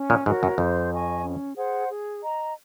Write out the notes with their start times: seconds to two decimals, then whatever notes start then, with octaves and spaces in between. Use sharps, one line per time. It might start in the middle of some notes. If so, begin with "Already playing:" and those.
Already playing: C#4
0.10 A#2
0.25 G#2 F#4 A#4 C#5
0.43 F#2
0.58 F2 C5
0.91 D#5 G#5 C#6
1.24 C#4
1.56 G#4 C5 F#5
1.89 G#4
2.21 D#5 A#5